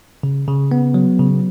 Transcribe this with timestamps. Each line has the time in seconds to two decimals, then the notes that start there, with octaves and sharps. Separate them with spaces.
0.23 C#3
0.48 C#3
0.71 B3
0.94 F#3
1.19 C#3